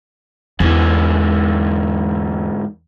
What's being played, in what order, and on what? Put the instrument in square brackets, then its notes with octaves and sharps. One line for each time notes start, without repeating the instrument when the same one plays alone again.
[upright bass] E2 [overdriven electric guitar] G#2 E3